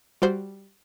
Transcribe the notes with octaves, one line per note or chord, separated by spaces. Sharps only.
G3 F#4 C5